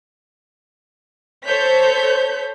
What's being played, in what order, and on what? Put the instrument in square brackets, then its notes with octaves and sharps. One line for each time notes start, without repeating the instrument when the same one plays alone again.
[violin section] A4 C5 C#5 G6 B6